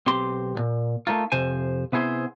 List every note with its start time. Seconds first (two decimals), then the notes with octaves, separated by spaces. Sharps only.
0.07 B1 C4 G4 C6
0.55 B1 A#2
1.07 A3 A#3 D#4 F4
1.32 F2 C3 C5 G#5
1.92 C3 B3 E4 G#4 C5